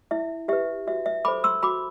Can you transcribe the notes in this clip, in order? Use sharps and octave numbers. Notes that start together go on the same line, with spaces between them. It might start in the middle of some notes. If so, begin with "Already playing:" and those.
E4 E5
G4 B4 E5
F#4 E5
E5
A4 C5 B5 D6
C6 E6
F#4 B5 D6